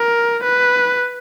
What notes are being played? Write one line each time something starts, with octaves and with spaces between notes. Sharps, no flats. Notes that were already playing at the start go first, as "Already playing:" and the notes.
Already playing: A#4
B4